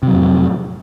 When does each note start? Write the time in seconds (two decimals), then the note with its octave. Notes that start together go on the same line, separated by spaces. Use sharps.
0.03 C3
0.07 F#3
0.12 F2
0.17 A2